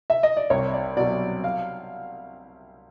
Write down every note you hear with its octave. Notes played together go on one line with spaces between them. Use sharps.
E5
D#5
D5
C2 C#5
D5
B2 F#3 D5
F5